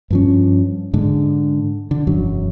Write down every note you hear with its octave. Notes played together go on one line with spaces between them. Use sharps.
G2 F3 C#4
G#2 D3
D3
E1 F#2 F#3